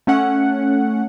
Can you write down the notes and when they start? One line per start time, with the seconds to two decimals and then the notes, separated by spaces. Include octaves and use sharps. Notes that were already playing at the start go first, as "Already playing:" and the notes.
0.07 A3 C#4 F#5